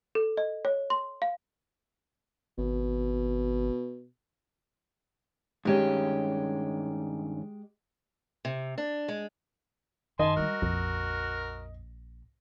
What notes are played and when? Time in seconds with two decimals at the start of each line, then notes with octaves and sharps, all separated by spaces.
0.15 A4
0.37 D#5
0.65 C#5
0.90 C6
1.22 F5
2.58 G#1 B2
5.65 G2 D#3 G#3 C#4 G4
8.45 C3
8.78 D4
9.08 G#3
10.19 F#2 D#3 D#5 G#5 A5 C6
10.36 G3 G#3 F#4 A#4
10.62 A#1 F2